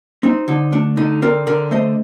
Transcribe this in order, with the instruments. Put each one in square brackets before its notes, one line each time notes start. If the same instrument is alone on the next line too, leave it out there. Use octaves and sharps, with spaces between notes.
[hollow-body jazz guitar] C4 D#4
D3 D#4
A3 D4
D3 D#4
C4 A#4 D5
D3 A#4 D5
A3 C5 D#5